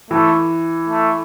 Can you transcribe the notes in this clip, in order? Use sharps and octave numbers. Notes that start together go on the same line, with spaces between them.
E3 A3
A3